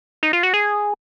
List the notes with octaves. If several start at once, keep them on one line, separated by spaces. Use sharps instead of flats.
D#4
F4
F#4
G#4